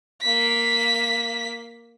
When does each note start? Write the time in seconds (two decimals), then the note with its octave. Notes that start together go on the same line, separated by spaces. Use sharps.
0.22 A#3 B6